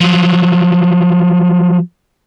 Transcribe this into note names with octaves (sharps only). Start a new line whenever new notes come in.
F3 F#3